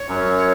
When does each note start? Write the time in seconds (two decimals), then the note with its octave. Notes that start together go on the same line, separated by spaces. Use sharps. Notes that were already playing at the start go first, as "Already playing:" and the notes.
Already playing: C#5
0.08 F#2